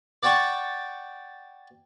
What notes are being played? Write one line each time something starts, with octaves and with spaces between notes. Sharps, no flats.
D5 F#5 G5 A5 C#6